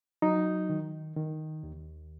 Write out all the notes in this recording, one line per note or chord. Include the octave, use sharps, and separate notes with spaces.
F#3 D#4
D#3
D#3
D#2